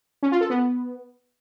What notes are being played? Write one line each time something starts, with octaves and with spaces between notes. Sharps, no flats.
C#4
F4
A4
B3